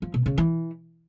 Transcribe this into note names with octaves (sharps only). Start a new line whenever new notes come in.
F3
B2
C#3
E3